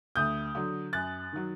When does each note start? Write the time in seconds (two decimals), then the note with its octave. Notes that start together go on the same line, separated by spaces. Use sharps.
0.16 D2 D#6 G6
0.55 D3 F#3
0.93 F#2 F#6 A6
1.32 D#3 F#3